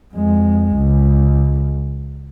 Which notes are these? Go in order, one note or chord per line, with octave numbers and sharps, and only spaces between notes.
F2 G#3
C#2